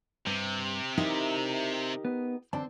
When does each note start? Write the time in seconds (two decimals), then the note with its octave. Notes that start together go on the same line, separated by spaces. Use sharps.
0.27 G2 C3
0.98 D#4 E4 G4 A#4
2.05 B3
2.53 D3 C4 D5 A5